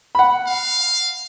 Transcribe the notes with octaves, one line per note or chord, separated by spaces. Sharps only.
F#5 B5
F5